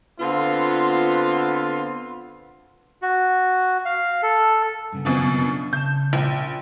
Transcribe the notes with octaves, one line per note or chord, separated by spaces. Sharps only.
D3 B3 C4 F4
F#4
F5
A4
G2 C#3 B3
F#2 B2 F3
D4
C#3 A5 G6
A#1